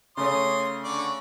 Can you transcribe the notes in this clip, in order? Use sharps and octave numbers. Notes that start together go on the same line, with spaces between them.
C#3 A3 C#4 C#5 C6 D#6
D3 D5 C#6